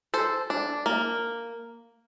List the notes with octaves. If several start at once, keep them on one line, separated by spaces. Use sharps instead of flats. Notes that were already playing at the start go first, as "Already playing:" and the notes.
A4 C5
D4
A#3